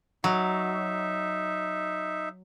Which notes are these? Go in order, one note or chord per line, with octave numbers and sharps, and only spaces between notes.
F#3 D#4 E5